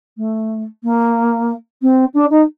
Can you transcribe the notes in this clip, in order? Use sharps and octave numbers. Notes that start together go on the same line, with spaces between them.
A3
A#3
C4
D4
D#4